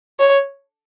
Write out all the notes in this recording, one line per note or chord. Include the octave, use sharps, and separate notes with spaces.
C#5